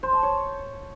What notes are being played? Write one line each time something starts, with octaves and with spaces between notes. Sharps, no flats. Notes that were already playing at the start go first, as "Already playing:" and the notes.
C5
A5
C#5